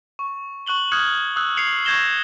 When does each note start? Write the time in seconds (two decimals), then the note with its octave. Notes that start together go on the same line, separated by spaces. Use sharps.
0.19 C#6
0.66 C#6 F#6 F#7 G7
0.92 D#6 F6 F#6 G#6 C#7
1.36 D#6 E6 F#6
1.57 G#6 C7 C#7 F7 F#7
1.85 C#6 G6 G#6 A#6 E7 G7